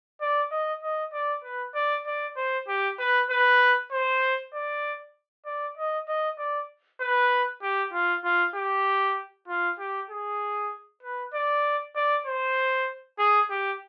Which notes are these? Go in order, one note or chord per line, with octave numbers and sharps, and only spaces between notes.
D5
D#5
D#5
D5
B4
D5
D5
C5
G4
B4
B4
C5
D5
D5
D#5
D#5
D5
B4
G4
F4
F4
G4
F4
G4
G#4
B4
D5
D5
C5
G#4
G4